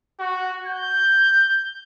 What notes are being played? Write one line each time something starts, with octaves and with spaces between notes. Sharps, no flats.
F#4
G6